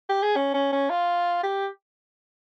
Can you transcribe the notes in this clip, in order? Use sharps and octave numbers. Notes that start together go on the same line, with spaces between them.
G4
G#4
C#4
C#4
C#4
F4
G4